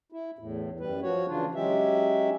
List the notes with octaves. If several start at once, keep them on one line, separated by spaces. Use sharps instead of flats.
E4
E2 A2
F#2 G3 B4
F3 F#4 C#5
C#3 E3 D4 F4
F#3 G#3 C#4 G4 E5